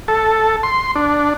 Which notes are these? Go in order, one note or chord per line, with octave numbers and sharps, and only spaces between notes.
A4
C6
D4